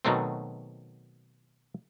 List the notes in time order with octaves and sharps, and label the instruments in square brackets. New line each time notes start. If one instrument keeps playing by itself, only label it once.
[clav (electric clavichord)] B2 D#3 F#3 A3 C4